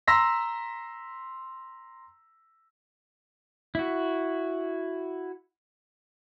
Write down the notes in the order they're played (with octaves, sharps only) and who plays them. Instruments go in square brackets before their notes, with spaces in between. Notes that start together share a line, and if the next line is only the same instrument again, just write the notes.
[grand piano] A#5 C6 E6 A#6 B6
[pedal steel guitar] E4 F#4